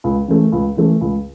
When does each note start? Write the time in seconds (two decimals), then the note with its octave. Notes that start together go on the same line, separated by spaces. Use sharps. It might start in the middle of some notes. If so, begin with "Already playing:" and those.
0.04 C#2
0.28 C#3 E3 A3
0.52 C#2
0.77 C#3 E3 A3
1.01 C#2